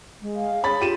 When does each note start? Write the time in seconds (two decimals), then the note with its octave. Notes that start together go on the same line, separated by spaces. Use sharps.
0.21 G#3
0.35 F5
0.63 G#4 C#5 B5 A6
0.81 F4 G4 D#7 E7